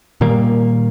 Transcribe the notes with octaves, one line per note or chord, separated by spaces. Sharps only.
A#2 D#3 G3 A#3